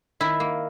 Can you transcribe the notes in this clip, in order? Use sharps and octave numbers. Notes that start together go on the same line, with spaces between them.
D#3 E4
A#3